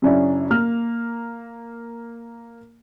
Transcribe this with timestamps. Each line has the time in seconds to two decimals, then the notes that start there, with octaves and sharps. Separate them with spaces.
0.02 F#2 C#3 C#4 D4 E4
0.50 A#3 F6